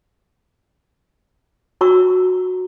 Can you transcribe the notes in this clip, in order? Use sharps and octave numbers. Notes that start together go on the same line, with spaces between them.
F#4 D5 A#5 C#6 E6